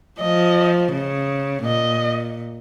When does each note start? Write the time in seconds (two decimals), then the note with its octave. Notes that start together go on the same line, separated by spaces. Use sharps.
0.20 F3 D#5
0.92 C#3
1.65 A#2 D#5